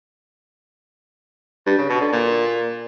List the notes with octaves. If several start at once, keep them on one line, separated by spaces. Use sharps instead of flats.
G2
C#3
B2
D3
A#2